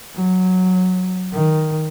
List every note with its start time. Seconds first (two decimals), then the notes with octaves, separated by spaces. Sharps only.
0.15 F#3
1.32 D#3